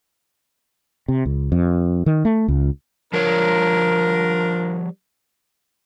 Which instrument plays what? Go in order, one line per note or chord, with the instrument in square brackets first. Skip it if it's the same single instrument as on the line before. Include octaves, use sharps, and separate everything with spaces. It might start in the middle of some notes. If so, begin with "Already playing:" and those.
[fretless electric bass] C3
C#2
F2
D#3
A3
C#2
[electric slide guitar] F3 G3 C#5 [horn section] D4 F4 A#4